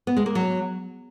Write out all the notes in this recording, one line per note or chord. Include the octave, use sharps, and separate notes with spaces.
B3
G#3
A#3
F#3